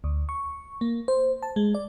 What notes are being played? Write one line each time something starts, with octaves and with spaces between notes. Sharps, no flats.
D2
C#6
A#3
C5
A5
G#3
D5